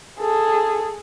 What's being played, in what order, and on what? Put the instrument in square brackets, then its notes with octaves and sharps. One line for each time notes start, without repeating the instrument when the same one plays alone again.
[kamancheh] G#4 A4